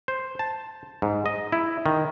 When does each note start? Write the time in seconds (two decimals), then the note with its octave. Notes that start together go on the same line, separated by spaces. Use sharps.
0.08 C5
0.39 A5
1.02 G#2
1.26 D#5
1.52 E4
1.86 D#3